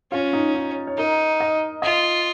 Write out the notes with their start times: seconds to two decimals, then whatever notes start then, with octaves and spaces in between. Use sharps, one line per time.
0.12 C#4 F4
0.33 D#4
0.54 D#4
0.87 C#5
0.97 D#4 A#4
1.40 D#5
1.82 F4 D#5